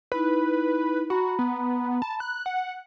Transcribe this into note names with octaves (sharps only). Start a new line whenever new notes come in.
D#4 E4 B4 B5
F#4 A#5 B5
B3
A5
F#6
F#5